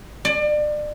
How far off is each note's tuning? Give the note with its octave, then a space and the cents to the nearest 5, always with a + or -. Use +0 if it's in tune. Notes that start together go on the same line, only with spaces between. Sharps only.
D5 +30